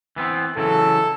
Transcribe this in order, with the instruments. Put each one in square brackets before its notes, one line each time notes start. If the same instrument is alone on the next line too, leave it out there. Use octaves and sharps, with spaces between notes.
[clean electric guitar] E3 B3 C4
[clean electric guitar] C#3 E3 F#3 [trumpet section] A4